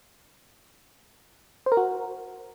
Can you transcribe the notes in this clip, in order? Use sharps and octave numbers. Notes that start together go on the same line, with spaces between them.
C5
A#4
F#4